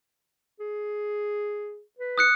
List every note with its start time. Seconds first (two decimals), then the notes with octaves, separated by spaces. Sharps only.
0.60 G#4
1.99 B4
2.18 D#6 F#6 C#7